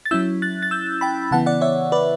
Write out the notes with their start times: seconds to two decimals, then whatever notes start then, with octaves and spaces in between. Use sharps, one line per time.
0.06 A6
0.11 F#3 C#4 E4 E6 G6
0.42 F#6 A6
0.62 A6
0.71 E6 G6
1.01 G5 B5
1.31 C#3 E3 B3 E4 F#5 A5
1.46 D5 F#5
1.61 C#5 E5
1.92 B4 D5